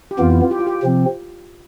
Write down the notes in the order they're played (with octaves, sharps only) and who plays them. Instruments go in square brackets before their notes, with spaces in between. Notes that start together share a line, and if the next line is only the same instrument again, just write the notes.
[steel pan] G4
[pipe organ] F2 E3 B3 [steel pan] F4
[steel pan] E4
F4
G4
F4
G4
[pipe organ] C3 F3 C4